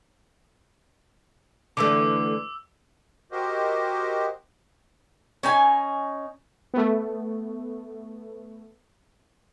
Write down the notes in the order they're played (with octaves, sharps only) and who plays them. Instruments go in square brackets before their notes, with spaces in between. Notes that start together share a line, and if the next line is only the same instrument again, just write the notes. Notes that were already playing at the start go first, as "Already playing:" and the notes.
[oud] D3 E3 A3 [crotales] D6 E6
[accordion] F#4 G4 A#4 C5 D#5
[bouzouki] C#4 D#4 G#5
[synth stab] A3 B3